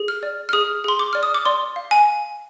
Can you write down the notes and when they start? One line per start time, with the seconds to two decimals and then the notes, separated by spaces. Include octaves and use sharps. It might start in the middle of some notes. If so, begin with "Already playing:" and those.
Already playing: G#4
0.08 F6
0.23 D5
0.49 F6
0.53 G#4 D#6
0.84 G#4 C6
0.99 D6
1.13 D5 F6
1.23 D#6
1.34 D6
1.45 D5 C6
1.76 F5
1.91 G#5